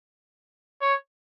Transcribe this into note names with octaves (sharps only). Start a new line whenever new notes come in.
C#5